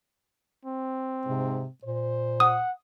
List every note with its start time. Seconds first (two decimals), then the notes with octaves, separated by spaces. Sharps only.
0.65 C4
1.26 G#2 C3
1.84 A#2 C5
2.40 F#5 D#6